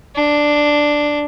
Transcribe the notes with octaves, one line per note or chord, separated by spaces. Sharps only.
D4